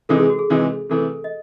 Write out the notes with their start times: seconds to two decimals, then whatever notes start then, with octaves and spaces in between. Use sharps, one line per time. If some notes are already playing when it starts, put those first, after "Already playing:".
0.09 C3 E3 G#3 D#4 A4
0.20 G#4
0.30 F#4
0.39 G#4
0.50 C3 E3 G#3 D#4
0.89 C3 E3 A3 A4
1.24 D#5